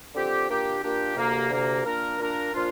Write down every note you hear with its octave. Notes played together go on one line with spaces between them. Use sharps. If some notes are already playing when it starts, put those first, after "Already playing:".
D3 F3 C4 G4
A#2 A#3 D4 G4
A#2 A#3 D4 G4
D2 C3 A#3
D2 C3 A#3
A#2 A#3 D4 A#4
A#2 A#3 D4 A#4
A#2 F3 D4 F4